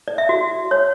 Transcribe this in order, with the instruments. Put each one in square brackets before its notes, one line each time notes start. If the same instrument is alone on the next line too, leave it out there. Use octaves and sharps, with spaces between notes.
[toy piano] D5
E5
F#4
C#5